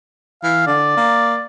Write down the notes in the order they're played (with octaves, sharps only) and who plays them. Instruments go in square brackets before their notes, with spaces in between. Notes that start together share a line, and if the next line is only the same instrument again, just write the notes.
[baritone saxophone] E3 [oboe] F5
[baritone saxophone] D3 [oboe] D5
[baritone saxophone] A#3